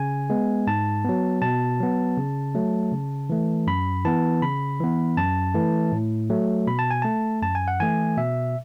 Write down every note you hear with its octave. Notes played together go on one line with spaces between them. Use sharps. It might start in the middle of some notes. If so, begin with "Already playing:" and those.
Already playing: C#3 G#5
G#3 B3
G#2 A5
F#3 B3
B2 A5
F#3 B3
C#3
F#3 A3
C#3
E3 A3
F#2 B5
E3 B3 A5
C#3 B5
E3 B3
F#2 A5
E3 A3
A2
F#3 A3
B2 B5
A5
G#5
A3 A5
F#2 A5
G#5
F#5
E3 A3 G#5
B2 E5